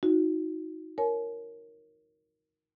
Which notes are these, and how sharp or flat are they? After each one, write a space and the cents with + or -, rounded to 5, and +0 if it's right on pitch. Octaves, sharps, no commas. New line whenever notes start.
D#4 +20 F#4 -25
A#4 +0 C#5 +0 G#5 +45